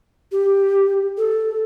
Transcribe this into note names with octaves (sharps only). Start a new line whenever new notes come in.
G4
A4